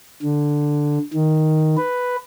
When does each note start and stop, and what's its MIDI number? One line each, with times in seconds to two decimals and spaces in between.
0.22 0.98 50
1.14 1.76 51
1.77 2.16 71